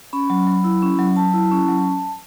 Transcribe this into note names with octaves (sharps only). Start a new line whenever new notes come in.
C#4 B5
F#3
F#3
E4
C#4
F#3
F#3 A5
E4
C#4
F#3